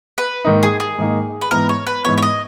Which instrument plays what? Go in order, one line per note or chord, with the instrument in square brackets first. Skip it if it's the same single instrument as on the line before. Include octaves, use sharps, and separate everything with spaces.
[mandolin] B4
[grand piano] G#2 D#3 A#3 D#4
[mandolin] G#4
G#4
[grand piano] G#2 D#3 A#3 D#4
[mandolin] B4
[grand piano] G#2 E3 B3 [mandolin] A#4
[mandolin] C#5
B4
[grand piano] G#2 E3 B3 [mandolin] C#5
[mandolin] C#5
D#5